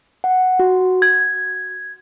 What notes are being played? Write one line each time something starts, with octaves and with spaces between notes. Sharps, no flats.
F#5
F#4
G#6